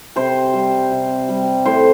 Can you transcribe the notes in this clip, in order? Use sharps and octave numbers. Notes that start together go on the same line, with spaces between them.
C3 C5
G3
C3
G3
A2 C5